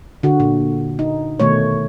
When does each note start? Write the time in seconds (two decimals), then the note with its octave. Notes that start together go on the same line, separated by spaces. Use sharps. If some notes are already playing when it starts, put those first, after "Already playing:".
0.23 D3 F#4
0.40 A#2
0.99 D#4
1.40 B2 D#3 A3 C#5